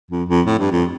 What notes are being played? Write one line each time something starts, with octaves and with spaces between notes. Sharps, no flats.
F2
F2
A2
G2
F2